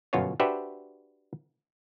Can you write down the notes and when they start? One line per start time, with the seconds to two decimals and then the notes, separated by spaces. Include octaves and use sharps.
0.13 G1 F#2 B2 F4 F#4 C#5
0.40 D4 F#4 G4 B4 C5 E5